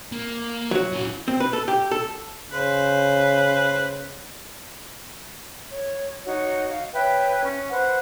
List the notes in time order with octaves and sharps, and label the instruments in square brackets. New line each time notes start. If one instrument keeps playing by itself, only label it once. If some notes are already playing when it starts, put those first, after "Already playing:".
[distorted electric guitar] A#3
[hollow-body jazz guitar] F#3 F#4
[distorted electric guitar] E3 C#4
[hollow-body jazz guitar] C4
B4
A4
G4
A4
[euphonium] C#3 [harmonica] B4 C5
[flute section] C#5
D#4 F#4 C#5
F5
B4 C#5 E5 G5
C#4
B4 C5 F#5